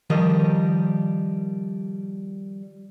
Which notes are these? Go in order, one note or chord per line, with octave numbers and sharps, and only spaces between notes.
D#3 F3 G3 A#4 D#5